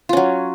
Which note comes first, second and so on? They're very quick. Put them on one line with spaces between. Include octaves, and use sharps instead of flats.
F4 C#4 F#3